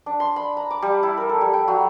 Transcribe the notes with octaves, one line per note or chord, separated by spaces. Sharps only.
D4
C6
B5
A#5
D6
G3
E4
A#4
A4
G3
G5
F#3